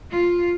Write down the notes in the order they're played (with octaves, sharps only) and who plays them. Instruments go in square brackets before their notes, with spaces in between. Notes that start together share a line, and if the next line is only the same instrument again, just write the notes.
[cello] F4